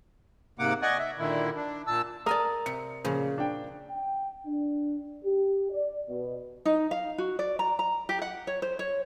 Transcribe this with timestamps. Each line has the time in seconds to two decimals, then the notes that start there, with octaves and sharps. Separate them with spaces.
0.59 G#2 C3 A#3 F#5 D6
0.82 D5 D#5 F#5 G#5 C#6
0.98 E5
1.18 A#2 D3 D#3 E4
1.56 D4
1.87 A#2 A5 E6
2.26 A#4 D5 F5 G#5 A5 D#6
2.66 C3 C#7
3.05 A#2 C#3 F3 C5
3.38 D4 G5
3.89 G5
4.46 D4
5.25 G4
5.71 D5
6.09 B2
6.65 D#4
6.91 F5
7.18 F#4
7.39 D5
7.59 A#5
7.79 A#5
8.09 G4
8.22 F#5
8.47 C#5
8.62 C5
8.79 C#5